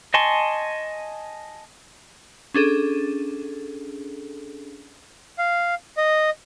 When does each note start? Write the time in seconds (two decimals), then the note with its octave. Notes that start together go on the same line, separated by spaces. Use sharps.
0.14 D#5 G#5 A5 C6 C#6
2.54 C#4 D4 G#4 A4
5.38 F5
5.97 D#5